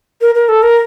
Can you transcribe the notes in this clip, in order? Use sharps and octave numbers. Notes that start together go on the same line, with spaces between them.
A#4
A#4
A4
A#4